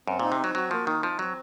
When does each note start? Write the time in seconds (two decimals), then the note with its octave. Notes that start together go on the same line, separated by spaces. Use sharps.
0.07 F#2 C4
0.20 A#2 D#4
0.32 C3
0.40 F#3 C4
0.55 F#3 F#4
0.71 F3 A#3
0.87 D#3 D#4
1.03 F3 C4
1.19 F#3 C4